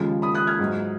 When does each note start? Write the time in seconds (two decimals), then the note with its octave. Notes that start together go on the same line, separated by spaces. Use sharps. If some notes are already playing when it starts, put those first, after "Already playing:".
Already playing: D#2 C#3 F3 G#3 F6
0.22 B5 D#6
0.34 D#6 F#6
0.47 F6 G#6
0.59 G#2 F#3